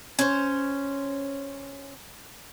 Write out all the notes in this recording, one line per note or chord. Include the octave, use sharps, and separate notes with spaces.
C#4 C5